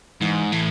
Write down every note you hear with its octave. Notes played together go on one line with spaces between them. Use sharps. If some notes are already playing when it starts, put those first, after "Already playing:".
G#2 E3
A2 E3